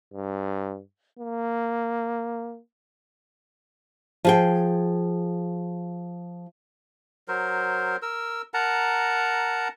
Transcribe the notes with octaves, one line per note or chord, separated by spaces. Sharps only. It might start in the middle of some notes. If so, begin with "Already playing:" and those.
G2
A#3
F3 G#4 G5
F#3 A#4 C5
A#4 E6
A#4 F#5 A5 A#5